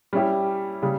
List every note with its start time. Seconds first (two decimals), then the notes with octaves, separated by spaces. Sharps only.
0.13 G3 C#4 E4 G4
0.82 C#3 G3